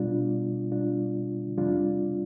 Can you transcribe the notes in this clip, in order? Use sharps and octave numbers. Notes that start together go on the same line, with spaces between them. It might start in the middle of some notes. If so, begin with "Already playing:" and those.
Already playing: B2 G3 D4 F4
B2 G3 D4 F4
F2 C3 G3 D4 F4